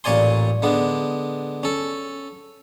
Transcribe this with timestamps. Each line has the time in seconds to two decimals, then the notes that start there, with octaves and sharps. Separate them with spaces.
0.04 A1 A#2 C#5 D5 G#5 C6
0.62 D3 G#3 B3 D4
1.63 C#4 A4